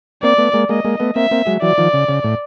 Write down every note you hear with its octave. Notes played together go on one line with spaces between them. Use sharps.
A#3 C4 D5
A3 B3
G#3 A#3
G#3 A#3 D#5
G#3 A#3
A3 B3
A#3 C4 E5
A#3 C4
F#3 G#3
E3 F#3 D5
D#3 F3
C#3
C#3
A2